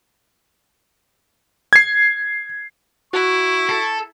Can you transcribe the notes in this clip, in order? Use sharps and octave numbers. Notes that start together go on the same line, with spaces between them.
G#6 C7
E4 F#4 C#6
A4